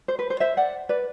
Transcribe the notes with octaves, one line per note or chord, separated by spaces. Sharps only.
C5
B4
C5
C5 E5
D5 F#5
B4 D5